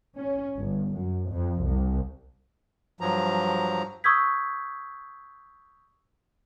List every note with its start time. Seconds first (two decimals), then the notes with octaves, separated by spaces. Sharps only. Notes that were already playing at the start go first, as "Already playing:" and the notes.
0.15 C#4
0.58 G1
0.96 F#2
1.30 F2
1.63 C2
3.01 G2 F3 F#3 A#5
4.04 C#6 D#6 E6 G6 G#6 B6